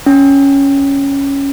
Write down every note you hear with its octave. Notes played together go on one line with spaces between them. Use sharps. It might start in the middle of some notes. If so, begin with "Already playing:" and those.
C#4